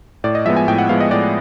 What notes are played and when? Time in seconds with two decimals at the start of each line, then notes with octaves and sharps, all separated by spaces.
0.24 A2 D5
0.35 D#5
0.46 F3 G#3 B3 E5
0.57 G#5
0.68 A2 G5
0.78 F#5
0.89 F3 G#3 B3 F5
1.00 D#5
1.11 A2 D5